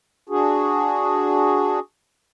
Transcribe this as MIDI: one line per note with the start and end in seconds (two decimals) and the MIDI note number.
0.29 1.79 62
0.29 1.79 66
0.29 1.79 68